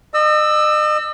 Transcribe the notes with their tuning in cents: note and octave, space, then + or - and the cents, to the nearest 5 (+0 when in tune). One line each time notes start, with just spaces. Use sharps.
D#5 -40 E6 +0